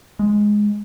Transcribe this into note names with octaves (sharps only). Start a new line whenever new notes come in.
G#3